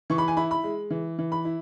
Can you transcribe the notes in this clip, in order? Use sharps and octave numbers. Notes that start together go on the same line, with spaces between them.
E3 C#6
B5
G#5
E4 B5
B5
G#3
E3
E3
B5
E4